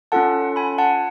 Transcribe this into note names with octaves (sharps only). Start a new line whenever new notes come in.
C#4 F4 A4 F#5 A5
G#5 B5
F#5 A5